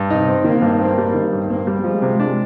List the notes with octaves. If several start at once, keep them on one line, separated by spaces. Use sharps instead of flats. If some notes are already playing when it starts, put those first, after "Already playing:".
Already playing: G2
C3 D#4
C4
D#3 A#3
G2
A#3 C4
G3
D#3
G2
A#3 C4
G3
F3 G#3
C3
D4